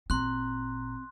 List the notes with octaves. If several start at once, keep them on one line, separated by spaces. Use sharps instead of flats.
G#1 A#2 C4 A#5 C6 F#6